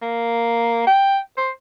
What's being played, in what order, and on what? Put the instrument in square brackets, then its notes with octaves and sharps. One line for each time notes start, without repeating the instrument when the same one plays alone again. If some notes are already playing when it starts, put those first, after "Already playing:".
[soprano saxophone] A#3
G5
C5